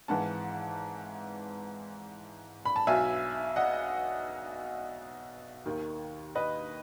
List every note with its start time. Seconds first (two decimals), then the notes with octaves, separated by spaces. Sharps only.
0.08 G#1 G#2 E3 F#5 A5
2.65 B5
2.76 A5
2.87 B1 B2 E5 G#5
3.56 D#5 F#5
5.66 D#2 D#3
6.35 B4 D#5